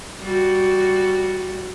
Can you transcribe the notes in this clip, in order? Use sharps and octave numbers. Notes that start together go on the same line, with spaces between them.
G3 F#4